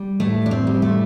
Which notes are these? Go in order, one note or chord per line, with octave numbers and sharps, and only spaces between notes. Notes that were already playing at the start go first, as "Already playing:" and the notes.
Already playing: G3
A2 A3
D4
C4
G3
A3